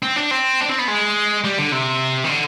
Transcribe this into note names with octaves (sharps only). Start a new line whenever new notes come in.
C4
D4
C4
D4
C4
B3
G#3
G3
D3
C3
D#3
D3